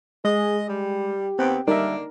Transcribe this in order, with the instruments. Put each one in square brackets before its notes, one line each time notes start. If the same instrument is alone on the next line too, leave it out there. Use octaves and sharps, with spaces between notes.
[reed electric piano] G#3 [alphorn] G#4 [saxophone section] D#5
[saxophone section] G3 [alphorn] G4
[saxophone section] D#2 B3 [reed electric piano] C4 [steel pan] G5
[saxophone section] D3 A#3 D4 [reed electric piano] G3 E5 [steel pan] D#4 A#4